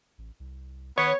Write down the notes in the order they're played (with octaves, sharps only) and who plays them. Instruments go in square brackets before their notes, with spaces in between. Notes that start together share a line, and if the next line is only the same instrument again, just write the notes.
[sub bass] A1
C2
[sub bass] D#3 [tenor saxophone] B3 [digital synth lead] C#5